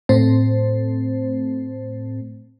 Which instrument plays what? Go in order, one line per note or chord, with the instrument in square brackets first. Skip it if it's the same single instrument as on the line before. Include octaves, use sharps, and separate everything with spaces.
[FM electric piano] A2 A3 C4 C5